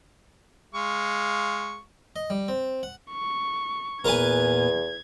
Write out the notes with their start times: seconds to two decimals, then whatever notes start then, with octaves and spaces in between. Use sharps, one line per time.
0.75 G#3 F5 C#6
2.16 D#5
2.30 G3
2.48 C4
2.83 F#5
3.11 C#6
4.04 E2 A#2 B3 A#4 B4 G#5 G#6